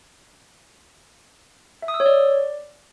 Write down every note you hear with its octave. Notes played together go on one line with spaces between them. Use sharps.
E5
D#6
E6
C#5
D5